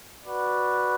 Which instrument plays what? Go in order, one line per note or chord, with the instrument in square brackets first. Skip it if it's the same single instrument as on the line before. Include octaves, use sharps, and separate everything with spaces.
[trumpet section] F#4 B4 D5